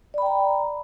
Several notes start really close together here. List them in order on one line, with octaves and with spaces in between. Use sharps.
D5 B5 G5 A#5